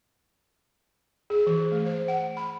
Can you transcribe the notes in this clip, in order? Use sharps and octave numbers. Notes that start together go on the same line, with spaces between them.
G#4
E3
A3
C5
F#5
B5